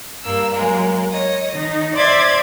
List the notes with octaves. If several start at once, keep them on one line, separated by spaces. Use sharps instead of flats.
G2 A#3 E6
F#3 G#3 A#3
C#5 D#5
D#3 D#4
C5 D5 E5 C6 D6 G#6